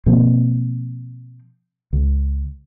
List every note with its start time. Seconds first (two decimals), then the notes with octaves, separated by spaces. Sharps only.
0.06 B2 F3 A#3 C4
1.93 C#2